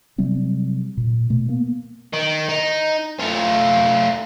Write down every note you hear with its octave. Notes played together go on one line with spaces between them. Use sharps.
C3 F#3 G3 C4
A#2
B2 A3
A#3 B3
D#3
D#4
A3 F4